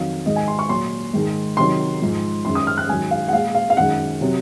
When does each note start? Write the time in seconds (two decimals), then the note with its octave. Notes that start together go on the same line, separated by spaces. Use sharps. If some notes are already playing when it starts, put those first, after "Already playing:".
Already playing: F2 D#3 F#3 F5
0.26 G#2 D#3 G#3 D#5
0.36 G#5
0.48 C6
0.59 C#6
0.69 A#2 F#3 C6
1.14 G#2 D#3 G#3
1.57 C3 D#3 F#3 C6
2.01 G#2 F3 G#3
2.45 F#2 D#3 G#3 C6
2.55 D#6
2.67 F6
2.78 F#6
2.89 G#2 D#3 F#3 G#5
3.11 F5
3.28 F#5
3.33 A#2 G#3 F5
3.55 F5
3.70 F5
3.77 F#2 D#3 G#3 F#5
4.21 C3 F#3